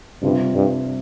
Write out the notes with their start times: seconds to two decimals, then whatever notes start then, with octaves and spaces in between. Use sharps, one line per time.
0.23 G2 C3 G3 D4 F4
0.55 G2